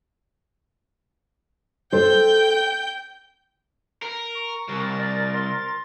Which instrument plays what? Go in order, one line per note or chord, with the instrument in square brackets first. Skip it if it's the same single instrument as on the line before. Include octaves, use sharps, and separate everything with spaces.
[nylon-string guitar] A4 C5 [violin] G5 G6
[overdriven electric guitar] A#4
[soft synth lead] C#6
[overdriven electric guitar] C2 [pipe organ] A#4 A6
[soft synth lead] D5
C6